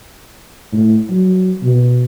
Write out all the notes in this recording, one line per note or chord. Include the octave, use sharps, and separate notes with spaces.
A2
F#3
B2